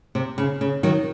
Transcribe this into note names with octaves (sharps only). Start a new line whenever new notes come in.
C3
C#3
C#3
D#3 F#3